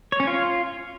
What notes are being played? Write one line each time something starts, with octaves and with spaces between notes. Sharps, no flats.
C#5
C#4
F4